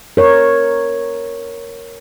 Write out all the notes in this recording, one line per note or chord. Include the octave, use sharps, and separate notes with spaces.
A#4 C#5